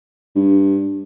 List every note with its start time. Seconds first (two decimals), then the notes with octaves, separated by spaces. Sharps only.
0.36 G2